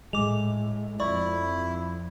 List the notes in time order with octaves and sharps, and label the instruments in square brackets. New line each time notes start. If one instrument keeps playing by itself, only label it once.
[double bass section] A2 [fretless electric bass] G#3 [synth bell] D6 F7
[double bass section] F2 [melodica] E4 [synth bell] D5 C#6